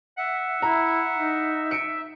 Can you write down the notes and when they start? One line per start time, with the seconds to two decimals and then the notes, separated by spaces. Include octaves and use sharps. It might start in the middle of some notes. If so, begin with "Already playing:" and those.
0.18 E5 F#5
0.62 E4 A#5
1.18 D#4
1.71 C#7 D7